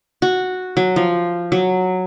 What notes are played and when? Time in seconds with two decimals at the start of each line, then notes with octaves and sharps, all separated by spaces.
0.22 F#4
0.77 F#3
0.96 F3
1.52 F#3